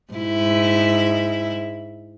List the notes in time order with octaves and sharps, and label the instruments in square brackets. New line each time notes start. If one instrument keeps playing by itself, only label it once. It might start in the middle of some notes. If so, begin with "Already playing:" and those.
[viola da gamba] G#2 E4